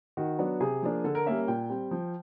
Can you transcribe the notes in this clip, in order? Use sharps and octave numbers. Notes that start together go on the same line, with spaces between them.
D#3 F#4
F#3 B3 D4
C3 G#4
F3 A#3 D4
D3 A4
A#4
G3 A#3 C#4 E5
A#2 G5
G3 C4
F3